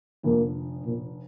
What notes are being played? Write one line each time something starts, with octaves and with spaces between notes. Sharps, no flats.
F1 F2 D3 F3 A#3
A#2